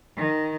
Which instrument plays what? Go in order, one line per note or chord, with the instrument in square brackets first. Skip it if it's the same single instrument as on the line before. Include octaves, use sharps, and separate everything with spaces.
[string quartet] D#3